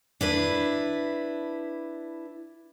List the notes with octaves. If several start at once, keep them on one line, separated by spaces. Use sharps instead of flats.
D4 E4 B4